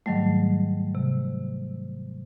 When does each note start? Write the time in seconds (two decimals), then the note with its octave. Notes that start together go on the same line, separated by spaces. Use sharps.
0.06 G#2 D#3 F#3 G3 A3
0.95 C3